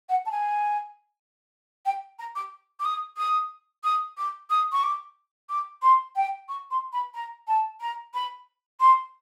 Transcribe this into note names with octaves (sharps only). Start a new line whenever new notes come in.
F#5
A5
G#5
G5
A#5
D6
D6
D#6
D#6
D#6
D6
D#6
C#6
D6
D6
C6
G5
C#6
C6
B5
A#5
A5
A#5
B5
C6